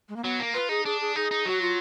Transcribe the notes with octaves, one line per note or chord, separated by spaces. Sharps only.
G#3
A#3
F#3 B3
A#3
F4 B4
D#4 G#4
D4 G#4
G#4
D#4 G#4
D#4
F#3 F#4
F4